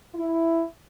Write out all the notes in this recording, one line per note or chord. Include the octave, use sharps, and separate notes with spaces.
E4